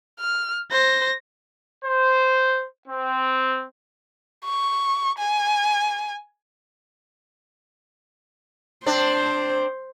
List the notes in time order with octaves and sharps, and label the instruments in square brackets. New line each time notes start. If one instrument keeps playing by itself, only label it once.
[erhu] F6
[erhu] C5 [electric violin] A#6
[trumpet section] C5
C4
[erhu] C#6
G#5
[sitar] C4 D4 [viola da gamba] C5